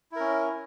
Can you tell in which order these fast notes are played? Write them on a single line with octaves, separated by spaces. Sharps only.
E4 A#4 C#4